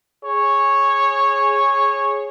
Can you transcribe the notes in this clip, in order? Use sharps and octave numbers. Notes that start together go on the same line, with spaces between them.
G#4 C#5